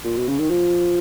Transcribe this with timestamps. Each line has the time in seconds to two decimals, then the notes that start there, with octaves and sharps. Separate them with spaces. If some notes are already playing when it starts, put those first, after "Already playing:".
0.04 A#2
0.16 B2
0.28 C#3
0.38 D#3
0.50 F3